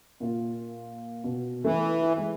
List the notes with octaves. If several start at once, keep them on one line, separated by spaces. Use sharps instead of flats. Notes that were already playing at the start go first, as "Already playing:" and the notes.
A#2 F4
B2
E3 A3
E4
G#3